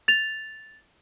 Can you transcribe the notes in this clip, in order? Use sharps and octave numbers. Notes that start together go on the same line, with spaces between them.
A6 F7